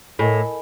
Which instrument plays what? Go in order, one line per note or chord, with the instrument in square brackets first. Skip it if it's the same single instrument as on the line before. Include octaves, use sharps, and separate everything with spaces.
[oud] A2 [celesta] A#4 D#5 G#5 B5